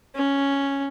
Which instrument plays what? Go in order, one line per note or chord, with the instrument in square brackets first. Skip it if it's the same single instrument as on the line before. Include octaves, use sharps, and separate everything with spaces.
[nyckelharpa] C#4